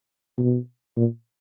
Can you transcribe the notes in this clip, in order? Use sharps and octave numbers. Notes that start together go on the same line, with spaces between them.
B2
A#2